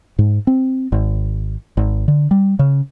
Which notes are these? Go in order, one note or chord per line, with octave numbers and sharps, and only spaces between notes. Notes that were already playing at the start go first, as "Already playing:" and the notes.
G#2
C4
G#1
G#1
D3
G3
C#3